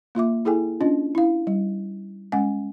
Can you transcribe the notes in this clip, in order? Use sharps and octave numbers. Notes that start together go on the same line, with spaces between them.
A#3 F4 E5 D6
E4 G#4 A4 G5 G#5
C#4 D4 F4 D#5
E4 F5
G3
G#3 C#4 F#5 G#5